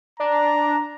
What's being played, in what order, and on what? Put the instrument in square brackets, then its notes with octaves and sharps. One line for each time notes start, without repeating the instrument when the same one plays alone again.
[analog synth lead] D4 [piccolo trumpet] A#5